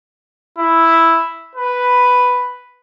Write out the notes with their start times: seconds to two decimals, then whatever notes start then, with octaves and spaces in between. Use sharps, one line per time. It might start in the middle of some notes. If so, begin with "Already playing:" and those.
0.58 E4
1.55 B4